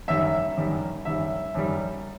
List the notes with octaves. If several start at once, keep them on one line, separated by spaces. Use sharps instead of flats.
F#2 D#3 G3 E5
F#2 D#3 G3
F#2 D#3 G3 E5
F#2 D#3 G3